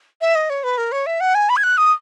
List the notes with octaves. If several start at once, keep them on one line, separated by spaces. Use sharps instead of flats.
E5
D#5
C#5
B4
A#4
C#5
E5
F#5
G#5
B5
G#6
F#6
D#6